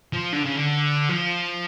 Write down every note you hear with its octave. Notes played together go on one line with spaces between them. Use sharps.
F3
D3
C#3
D3
F3